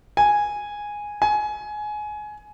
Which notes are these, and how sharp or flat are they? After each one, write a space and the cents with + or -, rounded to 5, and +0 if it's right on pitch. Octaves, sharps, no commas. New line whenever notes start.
G#5 -5
G#5 +20